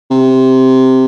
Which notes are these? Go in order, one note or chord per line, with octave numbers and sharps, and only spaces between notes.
C3